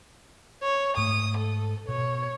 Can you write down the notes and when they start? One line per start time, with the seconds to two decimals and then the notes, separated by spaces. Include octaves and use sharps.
0.63 C#5
0.97 G#2 A3 D#6
1.37 A4
1.89 B2 C#5